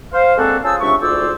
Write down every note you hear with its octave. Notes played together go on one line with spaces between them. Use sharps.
C5 F5
G#3 A#3 C4 D4 F#4 A4
C#4 F4 G#4 C5 A5 E6
C#2 C3 D4 E5 C#6
D2 G#2 F4 C5 D5 E6